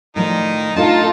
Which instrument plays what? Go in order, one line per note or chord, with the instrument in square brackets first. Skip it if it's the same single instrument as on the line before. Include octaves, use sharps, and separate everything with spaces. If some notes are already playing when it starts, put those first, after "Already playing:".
[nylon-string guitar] A2 F3 D5 [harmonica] D#3 D#4
[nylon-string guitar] A2 D4 [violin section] D#4 F4 A4 [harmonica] A5